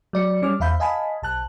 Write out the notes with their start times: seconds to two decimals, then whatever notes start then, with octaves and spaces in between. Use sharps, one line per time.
0.13 F#3 D5 C#7
0.42 G3 C#4 D6 F6
0.60 E2 E5 F5 B5 G6
0.80 D#5 F5 G#5 A5 B5
1.22 B1 A5 F#6